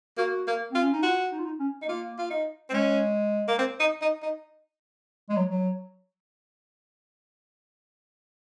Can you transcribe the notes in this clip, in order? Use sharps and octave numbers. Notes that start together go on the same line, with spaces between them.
A#3 F#4
A#3
C4 F4
C#4
D#4
F4 F#4
D#4
F4
D#4
C#4
D#4
A#3 F4
F4
D#4
C4
G#3 C#4
A#3
C4
D#4
D#4
D#4
G#3
F#3
F#3